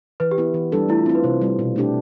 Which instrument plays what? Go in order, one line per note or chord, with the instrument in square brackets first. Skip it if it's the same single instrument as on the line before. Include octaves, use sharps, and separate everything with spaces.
[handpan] E3 [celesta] B4
[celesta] G4
[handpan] B3 E4
E3
G3 D4 A4
[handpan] A3 [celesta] E4
[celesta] F4
[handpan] C4 [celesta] E4
[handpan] F4
[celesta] B4
[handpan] C3 [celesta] C5
[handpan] G3 C4
B2
A3 D4 G4